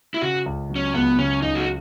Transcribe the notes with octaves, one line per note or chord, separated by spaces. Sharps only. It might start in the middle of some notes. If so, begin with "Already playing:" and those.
E4
C#3 F#4
C#2
F#3
C#4
C#2 B3
C#3 C#4
C#2 D#4
F#4